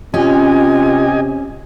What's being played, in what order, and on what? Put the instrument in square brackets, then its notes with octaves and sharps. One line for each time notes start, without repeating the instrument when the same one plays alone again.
[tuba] C3 [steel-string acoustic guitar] C#4 [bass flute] F4 [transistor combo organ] G4 D#5 G#5